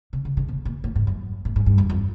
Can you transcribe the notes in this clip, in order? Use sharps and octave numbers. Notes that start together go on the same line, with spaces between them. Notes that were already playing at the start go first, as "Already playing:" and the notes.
C3
C#3
C#3
B2
A#2
A2
G#2
F#2
A2
G#2
G2
F#2
F2